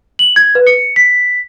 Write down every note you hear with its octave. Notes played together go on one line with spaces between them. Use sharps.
F#7
G#6
B4
C#7
B6